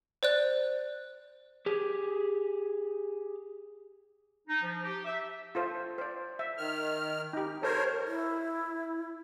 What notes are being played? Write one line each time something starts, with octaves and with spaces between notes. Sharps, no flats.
C5 D5 F#6
G4 G#4
D#4
F3
G4
E5
F4 A4 C5
C5 D5
E5
D#3 F6
D#4 G4
A4 A#4 C5 C#5
E4